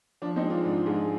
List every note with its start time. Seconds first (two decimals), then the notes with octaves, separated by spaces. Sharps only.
0.22 F3 D4
0.36 C4 D#4
0.43 G#3
0.50 D4 F4
0.65 G#2
0.86 G#2 F4 G#4